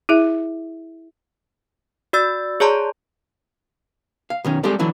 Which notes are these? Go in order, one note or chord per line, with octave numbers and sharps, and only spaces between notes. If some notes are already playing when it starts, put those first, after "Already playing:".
E4 G#4 E5
F#4 D5 E6 A6
G#4 C#5 D5 A5 A#5 C6
F5
B1 D#3 C#4
G3 G#3 C4 G4 A4 D5
D3 E3 F#3 D4